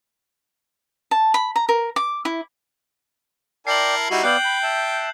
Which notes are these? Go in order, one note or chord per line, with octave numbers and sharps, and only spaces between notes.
A5
B5
A#5
A#4
D6
E4
E4 A#4 D5 G5 A5 C7 F#7
G3 D#4 E4 F#4
B3 D5 F5 G5 F#6 G6 F#7
B5
E5 A5